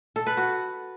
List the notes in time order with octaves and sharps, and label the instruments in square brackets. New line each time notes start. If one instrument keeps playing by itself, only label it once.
[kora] A4
B4
F#4